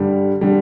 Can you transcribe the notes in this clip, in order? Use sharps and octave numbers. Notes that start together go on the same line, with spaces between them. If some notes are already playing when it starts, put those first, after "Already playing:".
Already playing: G2 D3 G3
D3 G3